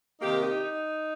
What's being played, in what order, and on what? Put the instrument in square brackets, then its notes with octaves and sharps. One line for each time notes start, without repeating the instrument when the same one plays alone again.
[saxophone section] C3 D#3 A#3 D#4 G4
D#4 G4
D#4